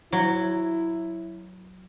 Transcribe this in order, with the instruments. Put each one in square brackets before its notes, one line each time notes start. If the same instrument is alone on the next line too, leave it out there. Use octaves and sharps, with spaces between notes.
[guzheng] F#3 [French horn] E4